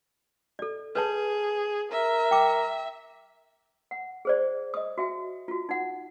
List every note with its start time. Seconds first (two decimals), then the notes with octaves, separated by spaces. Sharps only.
0.59 A4 D5
0.95 G#4 B4 C#5 A5
1.92 A#4 E5
2.31 G5 D6
3.91 F#5
4.25 G#4 C5 D5
4.74 D#5 D#6
4.98 F#4 E5 G5
5.48 F4 F#4
5.69 D#4 F#5